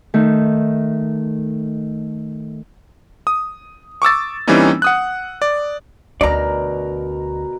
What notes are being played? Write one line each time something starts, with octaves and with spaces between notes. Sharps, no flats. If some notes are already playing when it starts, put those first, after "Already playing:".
D#3 A3
D#6
C#6 D6 E6 A6
E3 G3 A#3 C4 C#4 D#4
F#5 D#6 F#6
D5
D2 B2 D4 A#4 D5 A#5